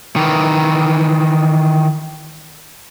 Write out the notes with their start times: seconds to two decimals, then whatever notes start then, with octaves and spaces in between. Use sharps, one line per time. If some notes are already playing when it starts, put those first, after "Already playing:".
0.16 D#3 E3